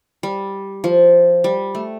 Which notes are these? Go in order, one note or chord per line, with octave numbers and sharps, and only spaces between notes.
G3
F3
G3
A3